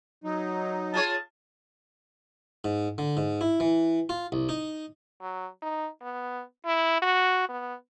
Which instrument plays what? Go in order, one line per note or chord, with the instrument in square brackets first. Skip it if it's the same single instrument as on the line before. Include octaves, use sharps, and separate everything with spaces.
[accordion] F#3 D#4
[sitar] F4 G#4 C#5 [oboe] A5
[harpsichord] G#2
D3
G#2
E4
E3
F4
C2
D#4
[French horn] F#3
D#4
B3
E4
F#4
B3